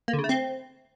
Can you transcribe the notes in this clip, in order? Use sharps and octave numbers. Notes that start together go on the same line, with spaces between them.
A#3
D3
C#3
A3
C4